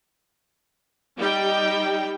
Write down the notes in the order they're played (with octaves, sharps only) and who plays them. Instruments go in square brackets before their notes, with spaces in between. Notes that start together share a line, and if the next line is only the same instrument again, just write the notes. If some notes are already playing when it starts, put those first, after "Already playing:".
[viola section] G3 D#4 G4 G5